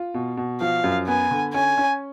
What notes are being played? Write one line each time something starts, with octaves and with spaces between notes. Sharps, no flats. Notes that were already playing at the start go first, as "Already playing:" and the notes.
Already playing: F4
B2
B2
F3 F5
F#2
B3 G#5
D3
C#4 G#5
C#4